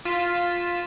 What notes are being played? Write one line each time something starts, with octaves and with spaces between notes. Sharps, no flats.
F4 B6 E7